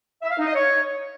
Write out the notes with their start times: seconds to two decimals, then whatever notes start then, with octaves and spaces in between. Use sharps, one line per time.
0.22 E5
0.30 F5
0.39 D#4
0.47 D#5
0.55 C#5